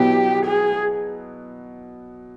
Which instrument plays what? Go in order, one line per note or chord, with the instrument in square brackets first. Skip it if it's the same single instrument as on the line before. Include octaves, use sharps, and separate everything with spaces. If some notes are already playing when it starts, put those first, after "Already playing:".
Already playing: [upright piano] B2 F#3 B3 E4 [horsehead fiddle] G4
[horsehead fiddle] G#4